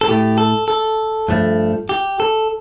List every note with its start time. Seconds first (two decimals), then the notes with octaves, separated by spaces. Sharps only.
0.01 A4
0.08 A2 A3 G4
0.38 A4
0.68 A4
1.29 G2 F3 A3
1.89 G4
2.20 A4